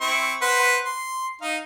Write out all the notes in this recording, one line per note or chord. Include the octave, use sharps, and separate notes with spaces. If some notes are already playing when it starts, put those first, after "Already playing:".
C4 E4 C#6
B4 C5 F#5
C6
D#4 F5